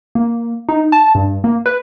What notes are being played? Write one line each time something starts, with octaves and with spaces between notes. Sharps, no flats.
A#3
D#4
A5
G2
A#3
B4